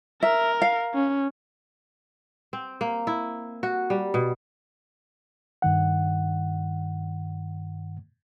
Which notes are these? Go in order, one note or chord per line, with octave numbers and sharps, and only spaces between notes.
A#4 E5
F5
C#4
C4
A#3
E4
F#4
G3
B2
G2 D#3 F#5